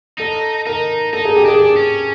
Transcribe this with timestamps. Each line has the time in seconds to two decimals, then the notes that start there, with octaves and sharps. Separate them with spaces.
0.19 D#4 A4
0.66 D#4 A#4
1.13 D#4 A4
1.25 G#4
1.37 G4
1.45 D4 G#4
1.60 G#4
1.76 C#4